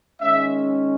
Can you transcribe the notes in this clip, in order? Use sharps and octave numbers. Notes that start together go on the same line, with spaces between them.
D#3 G#3 C#4 E5